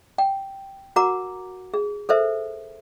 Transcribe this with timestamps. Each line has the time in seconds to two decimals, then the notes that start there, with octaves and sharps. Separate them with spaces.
0.18 G5
0.96 F#4 A#4 F#5 A#5 D6
1.74 G#4
2.09 A4 A#4 C5 E5